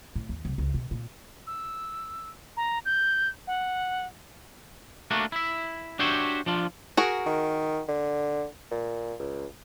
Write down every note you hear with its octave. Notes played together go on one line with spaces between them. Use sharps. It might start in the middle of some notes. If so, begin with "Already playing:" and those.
A2
D#2
C2
C#2
B2
A#2
E6
A#5
G6
F#5
A3 A#3 D4 F#4
E4 E5
D4 F#4 G4 C5 C#5 E5
F3 D4 F4
F#4 G#4 A#4
D#3
D3
A#2
C#2